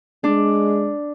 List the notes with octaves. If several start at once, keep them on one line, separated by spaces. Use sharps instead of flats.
G#3 D4